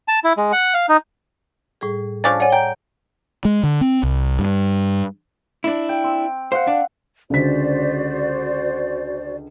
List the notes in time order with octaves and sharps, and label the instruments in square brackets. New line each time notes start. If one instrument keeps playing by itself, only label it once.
[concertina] A5
E4
G#3
F#5
F5
D#4
[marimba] A2 G3 G#4
[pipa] F3 C#4 D4 [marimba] A5 [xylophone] D6 A6
[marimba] C#5 F#5 [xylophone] D5 G#5
[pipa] G5 [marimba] A#5
[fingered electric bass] G#3
D3
C4
C2
G2
[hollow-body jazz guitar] D4 E4
[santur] G5
C4
[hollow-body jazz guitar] C5 [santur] F5 F#5
[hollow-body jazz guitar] D4
[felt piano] C#2 D3 B6 [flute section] F#4 C5 D5